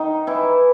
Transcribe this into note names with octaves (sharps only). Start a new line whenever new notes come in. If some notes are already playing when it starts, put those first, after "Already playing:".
Already playing: D#3 D#4
E3 E4